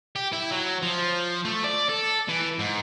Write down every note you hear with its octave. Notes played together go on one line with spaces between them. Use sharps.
G4
E4
F#3
F3
A3
D5
A4
E3
G#2